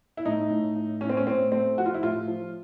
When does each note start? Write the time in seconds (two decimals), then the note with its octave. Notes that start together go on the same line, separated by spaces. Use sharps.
0.17 E4
0.25 A2 D#4
0.51 A2
0.76 A2
1.01 A2 C#4
1.09 C4
1.17 C#4
1.26 A2 C4
1.52 A3 C4
1.78 F3 F#4
1.86 F4
1.94 E4
2.02 A2 F4
2.28 F3